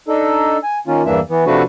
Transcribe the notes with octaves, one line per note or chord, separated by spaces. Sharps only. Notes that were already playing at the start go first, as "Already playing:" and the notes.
D4 D#4 A4
G#5
D#3 A#3 C#4 F4
E2 G2 E3 A#3 D4 E5
E3 B3
C3 F3 A3 D4 F#4 B4